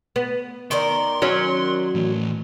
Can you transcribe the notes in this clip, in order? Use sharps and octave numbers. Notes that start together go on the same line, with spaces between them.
B3
D#3 A#4 D5 C6
F#3 C#4
A2 E3